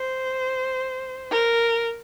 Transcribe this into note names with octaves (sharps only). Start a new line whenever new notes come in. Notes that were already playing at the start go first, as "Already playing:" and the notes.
Already playing: C5
A#4